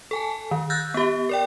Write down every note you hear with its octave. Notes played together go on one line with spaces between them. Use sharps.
A4 G#5 A5
D#3
E6 F#6 G6 A6 A#6
B3 G4
A#4 D5 G5